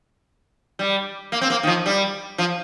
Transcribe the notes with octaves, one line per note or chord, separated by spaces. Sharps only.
G3
A#3
C4
A#3
D#3
F3
G3
F3